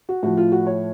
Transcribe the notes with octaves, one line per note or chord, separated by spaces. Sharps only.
F#4
A2 F3 F#4
F4
F#4
C#5